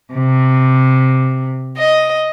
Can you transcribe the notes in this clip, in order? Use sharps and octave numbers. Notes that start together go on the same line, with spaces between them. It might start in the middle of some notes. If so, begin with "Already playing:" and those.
C3
D#5